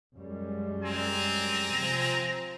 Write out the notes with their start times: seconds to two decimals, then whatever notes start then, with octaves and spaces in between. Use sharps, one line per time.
0.16 F#2 G3 G#3
0.83 C4 G#5 A#5
1.74 C3 F3